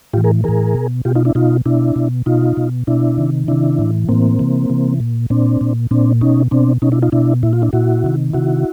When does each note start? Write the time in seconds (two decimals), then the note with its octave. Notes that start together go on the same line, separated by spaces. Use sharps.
0.13 A2 F4 G4
0.18 E3
0.24 G#4 A#4
0.44 A2 E3 G#4 A#4
0.75 B2
1.05 B2 F4 G4
1.15 D#4 F4
1.25 D4 E4
1.35 B2 D#4 F4
1.66 B2 D4 E4
1.96 B2
2.26 B2 D#4 F4
2.57 B2
2.87 B2 D4 E4
3.18 C3 D#3
3.48 C3 D#3 D4 E4
3.79 A2 E3
4.09 A2 E3 A#3 C4
4.39 C3 E3
4.70 C3 E3
5.00 A#2
5.30 A#2 C4 D4
5.61 A#2
5.91 A#2 C4 D4
6.21 B2 C#4 D#4
6.51 B2 C4 D4
6.82 B2 C#4 D#4
6.92 D4 E4
7.02 D#4 F4
7.12 B2 D4 E4
7.43 A#2 E4
7.53 F4
7.62 D4 E4
7.73 A#2 E4 F#4
8.04 C3 D#3
8.33 C3 D#3 E4 F#4